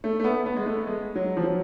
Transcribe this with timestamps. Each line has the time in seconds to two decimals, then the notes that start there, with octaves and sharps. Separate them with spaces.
0.04 A3
0.20 A3
0.24 B3
0.46 B3
0.57 G#3
0.66 A3
0.87 G#3
1.15 F#3
1.37 F3
1.43 F#3